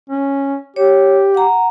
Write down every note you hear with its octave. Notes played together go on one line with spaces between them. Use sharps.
C#4
G4 C#5
F#5 A#5